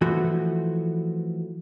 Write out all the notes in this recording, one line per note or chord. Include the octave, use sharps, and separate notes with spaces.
E3 F3 A3 F#4